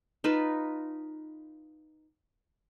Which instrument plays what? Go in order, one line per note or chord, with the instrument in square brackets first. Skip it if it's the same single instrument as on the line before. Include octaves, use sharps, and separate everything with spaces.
[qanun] D#4 F4 B4 A5